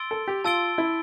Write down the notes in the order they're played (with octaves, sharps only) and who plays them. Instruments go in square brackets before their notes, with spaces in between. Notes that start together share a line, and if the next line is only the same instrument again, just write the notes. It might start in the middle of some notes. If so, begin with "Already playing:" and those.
Already playing: [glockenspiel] C6 E6 A6 D7 G7
[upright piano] A4
G4
[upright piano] F4 [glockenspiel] A5 E6 A6 D7 G7
[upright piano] E4